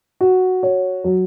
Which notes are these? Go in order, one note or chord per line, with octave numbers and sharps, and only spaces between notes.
F#4
C#5
F#3